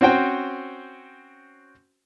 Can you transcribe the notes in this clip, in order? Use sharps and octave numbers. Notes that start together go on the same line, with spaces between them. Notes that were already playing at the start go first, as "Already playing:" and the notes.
C4 C#4 F#4 C5 G5